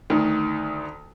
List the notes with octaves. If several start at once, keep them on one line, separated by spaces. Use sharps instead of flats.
D2 D#3